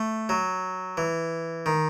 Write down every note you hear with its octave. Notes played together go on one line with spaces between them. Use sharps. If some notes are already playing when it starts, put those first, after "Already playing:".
Already playing: A3
F#3
E3
D#3